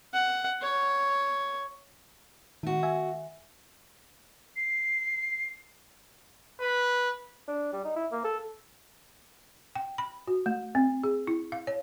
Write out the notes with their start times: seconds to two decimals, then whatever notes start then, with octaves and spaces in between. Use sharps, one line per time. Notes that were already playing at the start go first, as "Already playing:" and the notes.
0.13 F#5
0.61 C#5
2.63 D#3 A3 F#4
2.83 E5 G#5
4.56 C7
6.61 B4
7.48 D4
7.73 G3
7.85 D#4
7.96 E4
8.12 A#3
8.24 A4
9.76 G5
9.98 B5
10.28 F#4
10.46 A3
10.75 C4
11.04 G#4
11.27 E4
11.52 F5
11.67 C#5